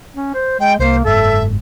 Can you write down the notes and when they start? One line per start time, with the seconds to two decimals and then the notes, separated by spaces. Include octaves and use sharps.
0.15 C#4
0.34 C5
0.60 G#3 G5
0.79 C2 A#3 C5
1.05 F#1 G#2 A4 E5